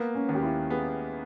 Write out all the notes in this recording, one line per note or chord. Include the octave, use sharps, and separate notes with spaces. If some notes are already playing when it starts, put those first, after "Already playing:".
Already playing: A#3 B3
C#4
D#2
G4
E4
B3 G#4